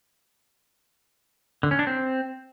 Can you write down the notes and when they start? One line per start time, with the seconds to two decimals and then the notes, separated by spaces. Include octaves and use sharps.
1.63 D3
1.71 C#4
1.79 D4
1.87 C4